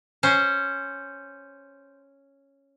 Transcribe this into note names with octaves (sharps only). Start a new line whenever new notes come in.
C#4 C5